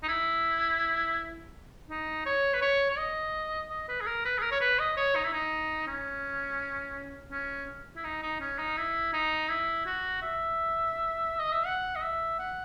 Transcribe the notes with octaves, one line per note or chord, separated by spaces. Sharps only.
D#4
E4
D#4
C#5
B4
C#5
C#5
D#5
D#5
B4
G#4
A#4
B4
G#4
A#4
C#5
B4
D#5
C#5
D#4
E4
D#4
C#4
C#4
E4
D#4
D#4
C#4
D#4
E4
D#4
E4
F#4
E5
D#5
E5
F#5
D#5
E5
F#5